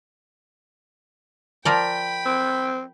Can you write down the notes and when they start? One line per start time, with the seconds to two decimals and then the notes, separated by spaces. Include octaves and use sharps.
1.65 F3 A#4 D5 G5 B5
2.26 C4